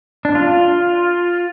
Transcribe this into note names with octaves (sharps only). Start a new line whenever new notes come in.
D4
F4